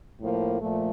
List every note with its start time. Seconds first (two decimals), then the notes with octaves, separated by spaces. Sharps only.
0.20 A2 F3 A#3
0.61 A#2 F3 A3